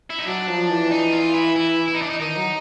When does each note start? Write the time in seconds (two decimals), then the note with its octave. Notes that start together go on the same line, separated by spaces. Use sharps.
0.10 E4
0.19 D#4
0.26 F#3 D4
0.48 F3
0.70 E3
0.91 D#4
1.13 F4
1.34 E4
1.56 E4
1.88 E4
1.94 D#4
2.02 D4
2.10 D#4
2.20 D#3 D#4
2.36 F#3